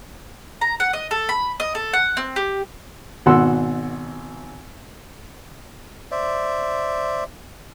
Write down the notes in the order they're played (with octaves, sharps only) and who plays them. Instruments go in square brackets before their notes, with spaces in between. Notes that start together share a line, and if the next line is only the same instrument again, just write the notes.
[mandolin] A#5
F#5
D#5
A4
B5
D#5
A4
F#5
C4
G4
[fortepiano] G#1 B2 F#5 C6 E6
[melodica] C5 D5 E5